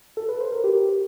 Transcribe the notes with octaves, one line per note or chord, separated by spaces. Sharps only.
A4
B4
C5
A#4
G4